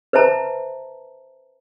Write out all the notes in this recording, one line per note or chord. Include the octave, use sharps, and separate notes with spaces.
B4 C5 E5 A5 A#5